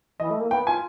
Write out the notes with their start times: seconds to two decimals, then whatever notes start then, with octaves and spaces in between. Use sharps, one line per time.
0.19 E3 D#5
0.30 A3
0.40 A#3
0.51 B3 G5
0.66 F4 G#5